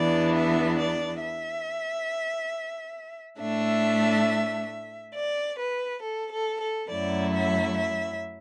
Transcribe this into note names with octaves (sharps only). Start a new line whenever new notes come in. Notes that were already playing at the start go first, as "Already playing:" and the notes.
Already playing: E2 E3 B3 D4 D5
E5
D5
E5
A2 A3 D4 E5
D5
B4
A4
A4
A4
F#2 F#3 A3 E4 D5
E5
E5